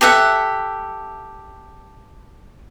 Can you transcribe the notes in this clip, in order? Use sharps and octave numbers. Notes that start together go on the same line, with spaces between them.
G4 A4 E5 F#5